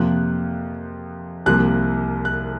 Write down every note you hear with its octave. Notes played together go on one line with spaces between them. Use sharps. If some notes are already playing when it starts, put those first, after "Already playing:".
Already playing: F2 C3 F3 A#3 F#6
C2 C3 F3 A#3 F#6
F#6